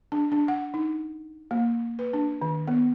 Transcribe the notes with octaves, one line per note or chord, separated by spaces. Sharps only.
D4
D4
F#5
D#4
A#3
B4
D4
D#3
B3